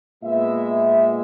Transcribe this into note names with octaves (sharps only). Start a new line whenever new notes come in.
A#2 G#3 B3 E5
E5